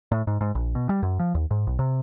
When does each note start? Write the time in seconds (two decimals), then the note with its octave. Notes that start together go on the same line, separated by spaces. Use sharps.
0.12 A2
0.27 G#2
0.41 G#2
0.55 A#1
0.75 B2
0.89 G3
1.03 F#2
1.19 F3
1.35 D#2
1.51 G#2
1.67 B1
1.79 C3